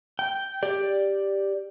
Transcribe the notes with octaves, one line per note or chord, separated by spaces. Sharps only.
G5
G4 D5